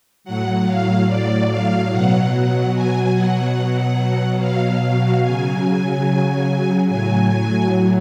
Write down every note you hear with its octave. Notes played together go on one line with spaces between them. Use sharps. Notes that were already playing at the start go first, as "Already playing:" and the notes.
A2 F#3 F#5
F5
D5
F5
B2 F#3 F#5
F#5
G#5
F#5
B2 F#3
F5
F5
C#3 F#3 G#5
A2 F#3 G#5
G#5